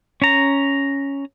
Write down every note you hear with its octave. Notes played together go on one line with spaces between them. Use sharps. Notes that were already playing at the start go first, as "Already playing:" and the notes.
C#4 A#5